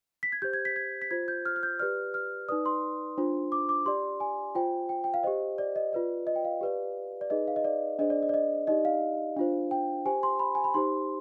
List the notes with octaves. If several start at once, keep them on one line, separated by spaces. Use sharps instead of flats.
B6
G#6
G4 C5 G6
G#6
B6
G#6
B6
F4 C5 G#6
G6
F6
F6
G6
G4 B4 D5 F6
F6
D#4 B4 D5 D#6
C6
D4 F4 C5
D6
D6
G4 D5 C6
G#5
F4 C5 G5
G5
G5
F5
G4 C5 D#5
D5
D#5
F4 B4 D5
D#5
G5
F5
G4 B4 D5
D5
D#4 G#4 B4 D#5
F5
D#5
D5
D4 G#4 C5 D#5
D5
D#5
D5
D#5
D#4 G4 D5 D#5
F5
D4 F4 C5
G5
G4 C5 G#5
C6
B5
G#5
B5
D#4 G4 C5 C6